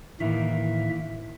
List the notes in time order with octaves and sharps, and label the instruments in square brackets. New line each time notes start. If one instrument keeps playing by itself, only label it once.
[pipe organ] A2 E5 [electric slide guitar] D#3 E3 A#3